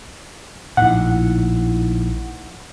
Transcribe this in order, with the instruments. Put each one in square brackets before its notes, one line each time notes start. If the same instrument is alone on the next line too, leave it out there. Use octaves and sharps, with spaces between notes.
[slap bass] A#1 A2 [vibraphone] D#4 E4 [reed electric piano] F#5